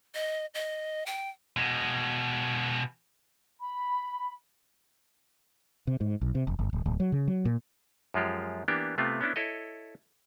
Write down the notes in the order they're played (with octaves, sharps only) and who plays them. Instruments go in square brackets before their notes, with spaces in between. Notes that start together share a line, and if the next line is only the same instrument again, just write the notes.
[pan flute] D#5
D#5
G5
[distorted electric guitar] B2 G#3
[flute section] B5
[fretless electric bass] C3
G#2
B1
C3
F1
G1
D1
D1
F#3
C#3
F#3
A#2
[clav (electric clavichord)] F#2 F3 G#3 F4 G4
E3 A#3 B3 D4 G4
C3 A3 B3 C4 F4
B3 C#4 D4 E4
E4 A4 C#5 D#5